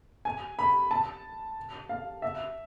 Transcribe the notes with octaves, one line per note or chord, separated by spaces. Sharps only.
G#5
B5
A5
F5
E5